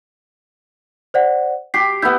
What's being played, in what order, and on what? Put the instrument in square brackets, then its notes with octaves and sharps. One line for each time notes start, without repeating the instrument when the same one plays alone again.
[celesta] C5 D5 F#5
[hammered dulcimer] G4 [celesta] C7
[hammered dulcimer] B3 E4 [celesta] G6